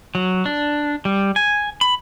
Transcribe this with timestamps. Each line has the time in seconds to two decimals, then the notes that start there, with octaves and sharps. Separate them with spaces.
0.15 F#3
0.46 D4
1.05 G3
1.36 G#5
1.81 B5